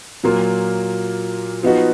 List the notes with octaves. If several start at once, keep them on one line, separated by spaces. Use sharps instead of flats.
A#2 F#3 A#3 F4
F3 B3 D#4 F#4